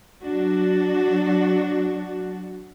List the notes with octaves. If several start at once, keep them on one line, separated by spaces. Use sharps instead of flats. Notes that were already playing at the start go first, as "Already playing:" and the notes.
F#3 D4 F#4